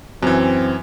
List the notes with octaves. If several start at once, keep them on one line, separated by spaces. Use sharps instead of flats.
F#2 E3 C4